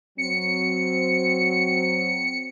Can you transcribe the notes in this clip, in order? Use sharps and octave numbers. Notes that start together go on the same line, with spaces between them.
F#3 C4 C#7